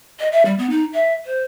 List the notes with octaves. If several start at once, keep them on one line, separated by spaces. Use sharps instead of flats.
D#5
E5
G3
B3
D#4
E5
C5